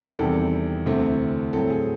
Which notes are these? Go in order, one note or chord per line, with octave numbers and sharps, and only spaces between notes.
E2 C3 D#3 G3 A4
D2 C3 E3 A3 C4
A2 F#3 A3 C4 A4
G#4